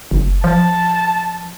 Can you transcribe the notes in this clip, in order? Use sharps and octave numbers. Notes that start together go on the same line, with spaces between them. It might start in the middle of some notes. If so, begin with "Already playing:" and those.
F#1
F3 A5